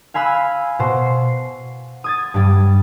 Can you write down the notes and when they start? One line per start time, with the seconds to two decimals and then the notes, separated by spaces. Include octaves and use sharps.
0.14 F5 G#5 B5 E6 F#6
0.79 B2 C5
1.06 C7
2.04 D#6 G#6 A6
2.34 G2 G3